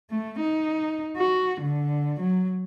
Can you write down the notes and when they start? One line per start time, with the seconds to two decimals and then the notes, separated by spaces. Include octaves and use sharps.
0.10 A3
0.40 D#4
1.17 F#4
1.61 D3
2.20 F#3